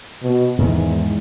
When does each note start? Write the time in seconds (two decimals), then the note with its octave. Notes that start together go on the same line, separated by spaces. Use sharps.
0.22 B2
0.58 E2 G#2 D#3 G#3